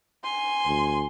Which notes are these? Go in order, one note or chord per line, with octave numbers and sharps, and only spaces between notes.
G#5 C6
D2